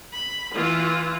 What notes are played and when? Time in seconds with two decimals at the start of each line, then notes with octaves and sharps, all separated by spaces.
0.13 B5
0.54 E3 F4